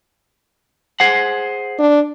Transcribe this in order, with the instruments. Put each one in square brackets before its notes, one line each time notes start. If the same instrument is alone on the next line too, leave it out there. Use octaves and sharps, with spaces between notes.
[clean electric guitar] G#4 C5 F#5
[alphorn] D4